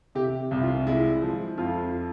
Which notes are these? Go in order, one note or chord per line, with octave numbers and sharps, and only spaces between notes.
C3 G4
C2
F4
G#3 E4
F3
F2 F4